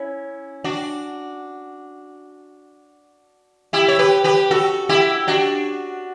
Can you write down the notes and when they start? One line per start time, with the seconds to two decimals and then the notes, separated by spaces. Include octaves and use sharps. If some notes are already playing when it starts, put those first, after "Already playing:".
Already playing: C#4 E4
0.64 D4 F#4
3.73 E4 G4
3.88 C#5
3.99 G4 B4
4.24 G4 B4
4.51 F#4 A4
4.89 E4 G4
5.27 D4 F#4